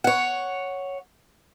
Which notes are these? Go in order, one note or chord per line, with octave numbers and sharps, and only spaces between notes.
C#5 F#5